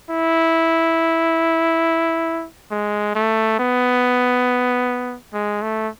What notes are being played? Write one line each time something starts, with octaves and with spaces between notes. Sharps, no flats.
E4
G#3
A3
B3
G#3
A3